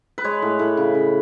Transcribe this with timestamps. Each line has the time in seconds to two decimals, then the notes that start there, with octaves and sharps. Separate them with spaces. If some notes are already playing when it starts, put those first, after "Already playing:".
0.18 B4
0.24 G#3 C#5
0.42 A2
0.59 A2
0.77 C#3
0.94 C#3